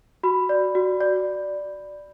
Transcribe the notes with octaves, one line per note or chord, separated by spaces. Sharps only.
F#4 B5
D5
F#4
D5